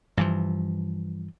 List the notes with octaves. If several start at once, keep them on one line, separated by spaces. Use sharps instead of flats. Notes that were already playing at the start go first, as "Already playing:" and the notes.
G2 E3 F3